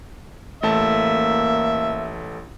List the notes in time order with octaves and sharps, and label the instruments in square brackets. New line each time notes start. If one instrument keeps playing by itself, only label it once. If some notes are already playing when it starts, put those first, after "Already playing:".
[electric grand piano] A1 A3 A5 [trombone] A#3 [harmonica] E5